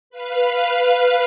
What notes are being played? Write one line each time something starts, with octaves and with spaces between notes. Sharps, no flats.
B4 F5